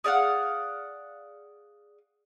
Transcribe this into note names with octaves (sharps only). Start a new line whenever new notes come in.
G#4 D5 F5 F#5